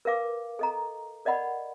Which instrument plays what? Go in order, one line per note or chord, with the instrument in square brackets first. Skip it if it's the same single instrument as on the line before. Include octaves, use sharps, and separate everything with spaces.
[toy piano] A#4 B4 F5 D6
A4 D#5 A#5
A#4 D5 D#5 F#5 B5